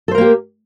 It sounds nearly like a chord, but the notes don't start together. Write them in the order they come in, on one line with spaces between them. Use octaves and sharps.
A4 C5 A#4 A#3 G4